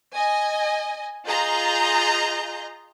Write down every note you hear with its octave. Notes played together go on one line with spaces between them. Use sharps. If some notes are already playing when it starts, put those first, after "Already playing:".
D#5 G#5
F4 G#4 D#5 A#5 G6